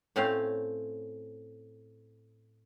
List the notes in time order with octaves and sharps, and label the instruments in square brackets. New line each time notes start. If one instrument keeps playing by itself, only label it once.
[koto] A2 A3 C4 C#4 F5